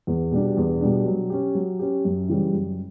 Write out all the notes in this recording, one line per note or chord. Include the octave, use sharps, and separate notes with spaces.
E2
B2 G3 D4
E2
B2 G3 D4
F#3
C#4 G4
F#3
C#4 G4
F#2
C#3 E3 G3 C#4
F#2